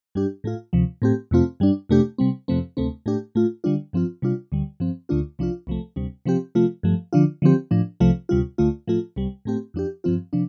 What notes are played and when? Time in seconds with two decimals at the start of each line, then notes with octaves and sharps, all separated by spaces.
0.15 G2 G3 D4 G4
0.44 A2 A3 F4
0.73 D2 C3 F3
1.02 A2 A3 C4 G4
1.31 F2 C3 A3 C4 F4
1.60 G2 G3 D4
1.89 F2 C3 A3 D4 G4
2.18 C3 G3 C4
2.48 F2 C3 F3 A3 C4
2.77 D2 C3 A3 C4
3.06 A2 A3 D4 G4
3.35 A2 A3 F4
3.64 D3 G3 D4 F4
3.93 G2 F3 C4 F4
4.22 C3 G3 D4 F4
4.52 D2 D3 G3
4.80 G2 F3 C4
5.09 D2 D3 A3 D4 F4
5.39 C2 C3 F3 D4 F4
5.67 C2 C3 F3 A3
5.96 D2 C3 G3
6.26 C3 F3 C4 G4
6.55 C3 F3 A3 F4
6.83 G2 F3 A3
7.13 D3 F3 D4 F4
7.42 D3 F3 C4 G4
7.71 A2 F3 D4
8.00 C2 C3 F3 A3 F4
8.29 D2 C3 G3 F4
8.58 D2 D3 A3 F4
8.87 A2 F3 A3 F4
9.16 C2 C3 G3
9.45 A2 A3 C4 G4
9.74 F2 F3 D4 G4
10.04 G2 F3 C4 F4
10.33 C3 F3 D4